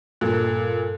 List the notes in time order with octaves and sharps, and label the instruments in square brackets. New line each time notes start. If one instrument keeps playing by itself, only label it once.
[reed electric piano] G2 A4 F#6 [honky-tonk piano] A#2